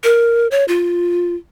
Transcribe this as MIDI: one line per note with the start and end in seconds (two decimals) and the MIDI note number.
0.04 0.48 70
0.51 0.65 73
0.68 1.35 65